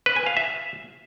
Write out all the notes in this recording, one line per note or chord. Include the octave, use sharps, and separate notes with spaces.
B4
G#5
F5
E5